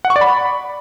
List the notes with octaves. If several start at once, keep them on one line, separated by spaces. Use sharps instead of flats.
F#5
C#6
D5
B5